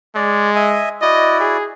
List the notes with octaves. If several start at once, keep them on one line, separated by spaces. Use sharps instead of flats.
G#3 D5
D#5 E5 G#5
E4 F#4 D5 D#5
G#4